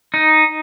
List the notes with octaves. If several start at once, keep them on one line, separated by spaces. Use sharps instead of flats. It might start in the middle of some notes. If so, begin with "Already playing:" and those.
D#4